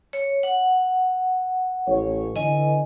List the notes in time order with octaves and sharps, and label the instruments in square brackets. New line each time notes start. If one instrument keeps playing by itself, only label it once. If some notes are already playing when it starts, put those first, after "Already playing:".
[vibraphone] C#5
F#5
[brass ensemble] A1 C#5
[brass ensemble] D3 E3 [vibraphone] D#5 G#5